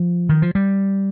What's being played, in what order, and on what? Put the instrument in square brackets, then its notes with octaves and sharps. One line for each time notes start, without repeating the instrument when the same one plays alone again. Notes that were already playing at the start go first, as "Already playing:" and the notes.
Already playing: [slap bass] F3
D#3
F3
G3